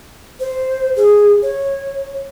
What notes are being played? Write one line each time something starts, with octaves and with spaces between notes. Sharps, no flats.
C5
G#4
C#5